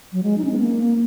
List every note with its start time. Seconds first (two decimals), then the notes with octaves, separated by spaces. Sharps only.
0.13 F#3
0.23 G#3
0.38 D#4
0.45 C#4
0.52 B3
0.59 A#3
0.83 A#3